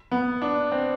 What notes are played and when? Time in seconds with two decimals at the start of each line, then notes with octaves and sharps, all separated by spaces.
0.12 B3
0.42 D4
0.72 C4